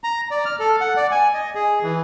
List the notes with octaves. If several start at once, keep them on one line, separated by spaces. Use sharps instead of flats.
A#5
D5
F6
A4
F#5
D5
G#5
D#5
G#4
E3